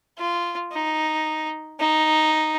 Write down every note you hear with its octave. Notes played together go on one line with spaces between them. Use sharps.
F4
D#4
D#4